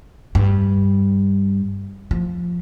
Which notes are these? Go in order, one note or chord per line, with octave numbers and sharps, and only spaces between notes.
G2
F3